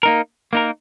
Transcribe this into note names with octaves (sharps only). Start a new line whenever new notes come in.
A#3 D#4 A#4
A#3 D#4 A#4